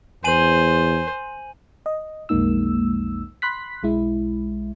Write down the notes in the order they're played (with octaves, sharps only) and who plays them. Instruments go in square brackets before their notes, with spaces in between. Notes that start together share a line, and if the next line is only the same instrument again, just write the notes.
[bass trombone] E2 [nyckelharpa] C5 [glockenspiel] G#5 D#7 F#7
[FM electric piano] D#5
B1 F2 G#3 A#3 D#4 E6
B5 C6 F#6 B6
B1 G#3 E4